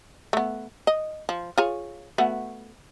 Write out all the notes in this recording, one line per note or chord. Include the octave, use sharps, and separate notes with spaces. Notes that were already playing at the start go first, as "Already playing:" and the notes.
A3 B3
D#5
F3
F4 G#4 C#5
A3 B3 F#4